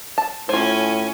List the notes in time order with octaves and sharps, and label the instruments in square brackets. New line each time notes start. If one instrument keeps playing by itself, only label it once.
[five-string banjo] A5
[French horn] A2 [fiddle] C#4 G#5 [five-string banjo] F4 C5